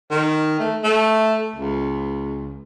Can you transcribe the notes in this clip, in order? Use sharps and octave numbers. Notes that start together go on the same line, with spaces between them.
D#3
A3
A3
C#2